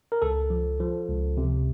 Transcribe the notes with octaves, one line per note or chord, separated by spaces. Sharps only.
A#4
C#2 A4
F3
F3
C#2
C3